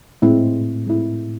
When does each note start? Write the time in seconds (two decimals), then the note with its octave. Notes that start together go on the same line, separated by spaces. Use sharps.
0.22 A2 G#3 C4 E4
0.87 G#3 C4 E4